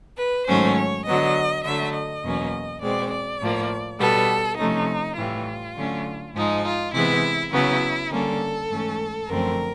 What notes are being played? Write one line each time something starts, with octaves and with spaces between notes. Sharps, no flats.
B4
G#2 D#3 F#3 A3 C#4 C5
C#5
D3 F#3 B3 D#5
D3 F#3 A3 E5
D#5
E2 B2 F#3 A#3 C#4
B2 G#3 C4 D5
D5
A2 F3 A#3
B2 G3 B3 A4
C3 F3 A3 C#4 D#4
A2 E3 G3 F4
D3 F#3 A3 C#4
G#2 F3 G#3 D#4
F4
C3 E3 G#3 B3 E4
C#3 F#3 B3 E4
D3 G3 A#3 C#4 A4
G#2 E3 A3 C#4
F#2 D3 F3 A3 C4 A#4